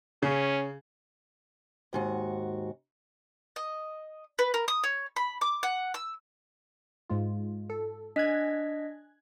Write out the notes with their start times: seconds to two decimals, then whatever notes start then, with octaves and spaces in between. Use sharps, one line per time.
0.22 C#3 C#4
1.93 D#2 G#2 F#4
3.56 D#5
4.39 B4
4.54 A#4
4.68 D#6
4.84 C#5
5.16 B5
5.41 D6
5.63 F#5
5.94 E6
7.10 G#2 G#3 F4
7.70 A4
8.16 D4 D#5 G#5 F#6 G#6 B6